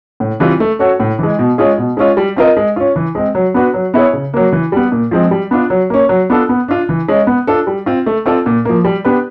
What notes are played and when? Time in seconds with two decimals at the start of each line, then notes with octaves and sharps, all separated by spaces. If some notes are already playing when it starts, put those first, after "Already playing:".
0.20 A2
0.40 E3 G3 C4 F4
0.60 A3
0.79 C#4 F#4 A4 C#5
1.00 A2
1.19 E3 G#3
1.39 B2
1.58 G#3 C#4 F4 G#4
1.78 B2
1.97 G#3 C#4 F4
2.17 G3
2.36 C4 F4 A#4 D#5
2.57 G#3
2.76 C#4 F4
2.96 E3
3.15 G#3 C4
3.35 F#3
3.54 B3 D4 F#4 B4
3.74 F#3
3.94 B3 E4 G#4 C#5
4.13 C#3
4.34 F#3 A#3
4.52 E3
4.72 G3 B3
4.92 A#2
5.11 F3 G#3 C4
5.31 G3
5.51 B3 D4 F4
5.70 F#3
5.90 A#3 C#4
6.09 F#3
6.30 B3 D4 F4 A4
6.49 B3
6.68 D4 F4
6.89 E3
7.08 G#3 C#4
7.27 B3
7.47 D4 F4 A4
7.67 G3
7.86 C4 F4
8.06 A3
8.26 C4 F4 A4 D5
8.46 A#2
8.65 F3 A#3
8.85 G3
9.05 B3 D4 G4 B4